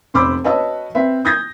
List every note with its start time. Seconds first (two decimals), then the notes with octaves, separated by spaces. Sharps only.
0.14 F1 C5 B5 D6 E6
0.44 F#4 B4 C#5 D#5 A5 E6
0.95 C4 B4 E5
1.25 D#6 G6 G#6 A#6